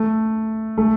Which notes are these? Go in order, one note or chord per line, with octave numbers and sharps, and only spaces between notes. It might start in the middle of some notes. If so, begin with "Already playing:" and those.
Already playing: A3
A3